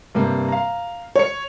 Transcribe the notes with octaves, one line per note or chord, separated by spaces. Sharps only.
G2 C3 A#3
F5 A#5
C#5 C#7